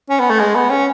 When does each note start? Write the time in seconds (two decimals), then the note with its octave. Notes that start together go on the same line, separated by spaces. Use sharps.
0.10 C#4
0.20 B3
0.30 A3
0.40 G#3
0.55 B3
0.70 C#4